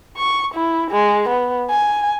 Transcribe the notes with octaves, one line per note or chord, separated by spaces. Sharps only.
C#6
E4
G#3
B3
G#5